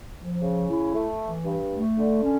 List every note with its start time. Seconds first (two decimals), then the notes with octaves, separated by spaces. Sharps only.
0.17 F3
0.42 C#3
0.68 E4
0.94 A3
1.20 E3
1.45 G2
1.71 A3
1.97 D3
2.22 C#4